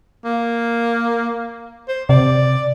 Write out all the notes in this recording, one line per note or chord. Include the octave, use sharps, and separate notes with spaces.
A#3
C5
C3 D5